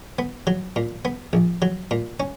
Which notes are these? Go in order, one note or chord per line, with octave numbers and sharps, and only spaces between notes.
B3
F#3
A#2
B3
A#1
F#3
A#2
C#4